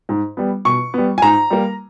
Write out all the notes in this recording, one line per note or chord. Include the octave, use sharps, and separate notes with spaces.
G#2
G3 B3
B2 C#6
G3 B3
G#5
G#2 A#5
G3 A#3